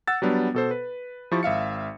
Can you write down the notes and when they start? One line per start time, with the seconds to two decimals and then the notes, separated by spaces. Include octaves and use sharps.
0.08 F#5 E6 A6
0.22 F#3 G3 B3 D4
0.54 B2 A4 C5
0.71 B4
1.31 F3 E4 G4 C#6 A6
1.43 G#1 E5 F5 C#7